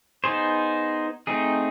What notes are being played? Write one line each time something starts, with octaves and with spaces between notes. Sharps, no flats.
B3 D#4 G#4 C5
A3 C4 D#4 G#4